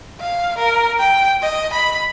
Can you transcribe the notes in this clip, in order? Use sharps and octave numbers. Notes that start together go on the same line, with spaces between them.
F5
A#4
G5
D#5
B5